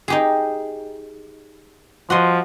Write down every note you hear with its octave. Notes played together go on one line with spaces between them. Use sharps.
D#4 G4 G#4
F3 F#4 D#5 C6